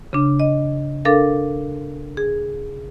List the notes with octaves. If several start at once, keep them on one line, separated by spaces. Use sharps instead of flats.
C#3 D4
D#5
D4 A4 A#4 F5
G#4